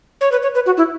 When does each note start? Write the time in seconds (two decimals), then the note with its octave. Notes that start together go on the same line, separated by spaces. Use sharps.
0.21 C#5
0.32 B4
0.43 C#5
0.55 B4
0.66 F#4
0.77 E4